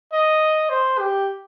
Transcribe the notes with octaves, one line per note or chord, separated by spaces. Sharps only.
D#5
C5
G4